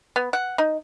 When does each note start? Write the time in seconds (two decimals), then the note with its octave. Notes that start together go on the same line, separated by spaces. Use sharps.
0.16 B3
0.33 F#5
0.58 D#4